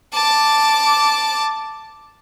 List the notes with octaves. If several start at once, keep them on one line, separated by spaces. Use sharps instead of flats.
A5 D6